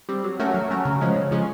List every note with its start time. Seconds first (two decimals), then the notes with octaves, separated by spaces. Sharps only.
0.09 G3 C4
0.24 F#3
0.39 A3 C#4 F#4 A#4
0.54 F#3
0.71 A3 C#4 F#4 A#4
0.85 C#3
1.01 F3 G#3 C#4
1.16 C#3
1.31 F3 G#3 C#4